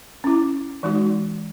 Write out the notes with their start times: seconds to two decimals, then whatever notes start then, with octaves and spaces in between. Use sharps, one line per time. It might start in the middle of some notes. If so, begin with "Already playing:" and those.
0.24 C#4 E4
0.83 E3 G#3 D#4 F#4